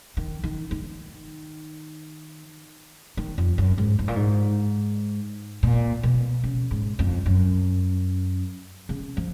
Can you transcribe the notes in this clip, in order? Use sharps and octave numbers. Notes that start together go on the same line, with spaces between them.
D#3
D#3
D#3
D#3
F2
F#2
G#2
G#2
A#2
G#2
A#2
B2
C#3
G#2
F2
F#2
C#3
F3